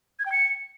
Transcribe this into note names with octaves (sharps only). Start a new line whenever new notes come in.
G#6
G5
C#7